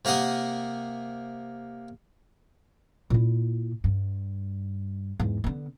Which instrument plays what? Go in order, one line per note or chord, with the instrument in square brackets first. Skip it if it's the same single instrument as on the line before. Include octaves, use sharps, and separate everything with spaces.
[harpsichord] C3 A#3 A#4 F#5 D#6
[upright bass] A#2 E4
G2
E2 G#2
D3 B3